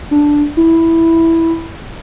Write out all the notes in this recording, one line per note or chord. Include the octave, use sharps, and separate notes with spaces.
D4
E4